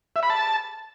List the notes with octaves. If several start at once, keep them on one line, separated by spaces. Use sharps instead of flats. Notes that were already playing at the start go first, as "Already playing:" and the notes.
E5
B5
A5